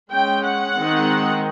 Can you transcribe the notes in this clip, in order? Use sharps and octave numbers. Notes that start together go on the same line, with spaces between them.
G#3 C#4 G5
F#5
D#3 G#3 C4 D#4